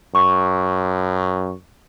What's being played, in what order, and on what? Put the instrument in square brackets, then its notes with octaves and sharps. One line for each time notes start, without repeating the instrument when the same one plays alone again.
[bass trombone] F#2 [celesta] C#6